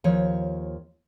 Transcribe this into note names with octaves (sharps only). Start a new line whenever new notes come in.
D#2 F3 C#5